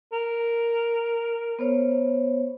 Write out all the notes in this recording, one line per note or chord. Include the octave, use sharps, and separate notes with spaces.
A#4
B3 C5 C#5